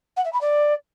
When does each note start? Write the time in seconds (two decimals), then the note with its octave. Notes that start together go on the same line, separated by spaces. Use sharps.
0.17 F#5
0.25 E5
0.33 B5
0.41 D5